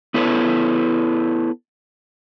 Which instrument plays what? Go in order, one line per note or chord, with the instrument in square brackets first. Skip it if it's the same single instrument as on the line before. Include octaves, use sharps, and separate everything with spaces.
[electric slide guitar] B3 E4 A4 B4 C#5